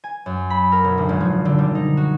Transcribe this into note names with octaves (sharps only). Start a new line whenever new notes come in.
G#5
F#2
B5
A#4
B1
D2
G#1
F3
D3
G3
D#4
F#4